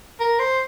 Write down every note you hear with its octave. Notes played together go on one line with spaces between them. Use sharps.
A#4
C5